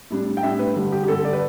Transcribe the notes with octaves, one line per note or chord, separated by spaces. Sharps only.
A2 G3 D4
G5
A2 G3 D4 E5
B4
G2 D3 G3
G4
G4
G2 D3 G3 A4
D5
B4